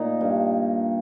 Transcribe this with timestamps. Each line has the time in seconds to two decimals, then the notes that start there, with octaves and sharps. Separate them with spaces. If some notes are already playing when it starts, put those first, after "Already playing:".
Already playing: A#2 D#4
0.21 G2